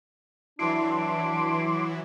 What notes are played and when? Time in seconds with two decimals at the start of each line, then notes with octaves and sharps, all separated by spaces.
0.59 E3 F#3 D4 E4 C6 D6